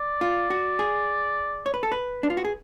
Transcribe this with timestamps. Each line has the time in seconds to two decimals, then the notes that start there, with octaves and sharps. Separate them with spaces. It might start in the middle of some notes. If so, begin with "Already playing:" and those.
Already playing: D5
0.21 F4
0.50 F#4
0.79 G#4
1.66 C#5
1.74 B4
1.83 A4
1.92 B4
2.23 D4
2.30 F4
2.37 F#4
2.45 G#4